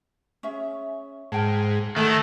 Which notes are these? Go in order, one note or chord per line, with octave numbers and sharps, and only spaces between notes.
C#4 G#4 E5
G#2 A#4 G5 A5
D#3 A3 D#4 F#5 A5 A#5